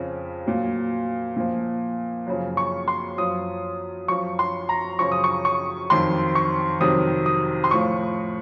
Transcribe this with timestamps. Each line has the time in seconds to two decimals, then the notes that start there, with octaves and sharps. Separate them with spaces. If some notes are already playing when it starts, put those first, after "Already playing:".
Already playing: F2 C#3 F3
0.46 A#2 F#3
1.37 A#2 F3
2.27 F#2 C#3 F3
2.57 C#6
2.88 C6
3.18 F#2 F3 D#6
4.08 F#2 F3 C#6
4.39 C6
4.69 A#5
4.99 F#2 C#3 F3 C#6
5.12 D#6
5.24 C#6
5.45 C#6
5.90 F2 D#3 F#3 C6
6.35 C#6
6.81 F2 C3 D#3 F#3 D#6
7.26 D#6
7.64 C6
7.71 A2 F3 C#6